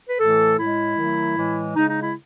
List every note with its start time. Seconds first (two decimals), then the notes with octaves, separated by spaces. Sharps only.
0.08 B4
0.18 A2 E3 A3 A4
0.57 A2 G#3 E4
0.96 D#3 F#3 A3
1.36 A2 E3 G#3
1.75 C#3 G#3 D#4
1.88 D#4
2.01 E4